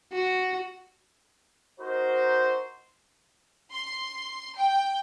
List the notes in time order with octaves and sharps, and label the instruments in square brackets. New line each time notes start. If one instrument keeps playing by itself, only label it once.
[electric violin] F#4
[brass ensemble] D#4 F#4 A#4 C5
[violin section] C6
G5